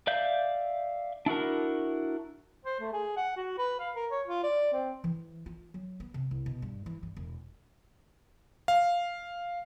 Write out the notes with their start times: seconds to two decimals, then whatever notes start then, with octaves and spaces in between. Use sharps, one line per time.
0.07 D5 E5 F5 G6
1.26 D4 E4 F#4 A#4
2.65 C5
2.80 A3
2.93 G#4
3.17 F#5
3.37 F#4
3.58 B4
3.79 F5
3.95 A#4
4.11 C#5
4.27 F4
4.44 D5
4.73 C4
5.04 E3
5.46 F4
5.74 F#3
6.00 B3
6.14 C3
6.31 C2
6.46 B2
6.62 G2
6.86 E3
7.03 G2
7.17 E1
8.68 F5